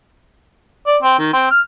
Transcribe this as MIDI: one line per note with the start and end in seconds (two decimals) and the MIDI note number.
0.87 0.97 74
1.03 1.15 60
1.19 1.28 51
1.33 1.48 60
1.51 1.60 89